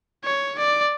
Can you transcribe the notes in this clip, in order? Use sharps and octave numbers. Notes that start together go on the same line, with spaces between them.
C#5
D5